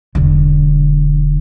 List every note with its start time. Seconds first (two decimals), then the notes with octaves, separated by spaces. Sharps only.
0.15 E1 D3